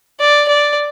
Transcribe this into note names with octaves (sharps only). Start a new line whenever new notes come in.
D5
D5